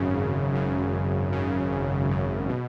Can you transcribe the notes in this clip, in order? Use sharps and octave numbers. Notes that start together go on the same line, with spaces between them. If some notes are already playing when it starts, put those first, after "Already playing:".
Already playing: G#1 F#2 C#3
G#1
F#2 C#3
G#1
F#2 C#3
G#1
F#2 C#3
B2